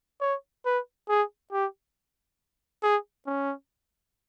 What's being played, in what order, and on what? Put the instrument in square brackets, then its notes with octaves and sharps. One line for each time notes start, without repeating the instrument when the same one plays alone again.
[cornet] C#5
B4
G#4
G4
G#4
C#4